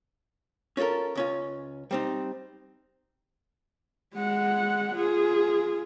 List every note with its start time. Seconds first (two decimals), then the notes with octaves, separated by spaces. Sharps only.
0.77 C#4 F4 F#4 A4 A#4
1.15 C#2 C#4 F4
1.91 G3 C4 D#4
4.15 G#3 F#5
4.95 F4 G#4